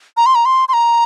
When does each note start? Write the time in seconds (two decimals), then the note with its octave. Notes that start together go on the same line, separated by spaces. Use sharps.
0.17 A#5
0.26 C6
0.35 A#5
0.45 C6
0.69 C6
0.73 A#5